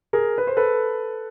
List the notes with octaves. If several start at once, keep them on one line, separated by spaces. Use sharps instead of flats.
G#4 A#4
B4
C5
A4 B4